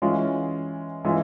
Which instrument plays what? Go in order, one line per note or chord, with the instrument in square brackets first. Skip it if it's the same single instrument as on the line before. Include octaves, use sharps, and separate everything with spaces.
[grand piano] E3 G#3 C#4 F4
E3 G#3 C#4 F4